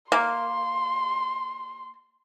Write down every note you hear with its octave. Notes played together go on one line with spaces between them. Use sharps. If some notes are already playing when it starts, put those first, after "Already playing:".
A#3 C6